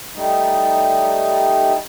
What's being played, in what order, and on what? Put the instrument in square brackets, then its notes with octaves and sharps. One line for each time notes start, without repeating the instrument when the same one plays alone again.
[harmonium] G3 A3 D#4